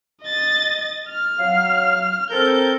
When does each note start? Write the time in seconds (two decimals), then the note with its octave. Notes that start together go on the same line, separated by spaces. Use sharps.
0.23 D#5 A6
1.09 F6
1.39 F#3 F5
2.31 C4 A4 A#4 G6